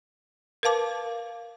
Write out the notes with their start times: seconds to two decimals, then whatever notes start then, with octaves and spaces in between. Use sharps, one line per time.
0.63 A#4 B4 F5 A5 D6